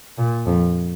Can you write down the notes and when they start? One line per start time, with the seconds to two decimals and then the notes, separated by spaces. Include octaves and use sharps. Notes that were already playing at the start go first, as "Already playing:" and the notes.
0.18 A#2
0.47 F2